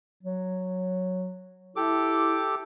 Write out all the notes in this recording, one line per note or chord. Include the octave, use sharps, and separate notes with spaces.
F#3
E4 G4 A4 D6